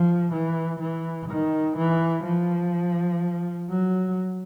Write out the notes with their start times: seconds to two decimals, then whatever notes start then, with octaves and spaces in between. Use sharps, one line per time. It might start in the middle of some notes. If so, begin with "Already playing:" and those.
Already playing: F3
0.32 E3
0.80 E3
1.29 D#3
1.77 E3
2.24 F3
3.69 F#3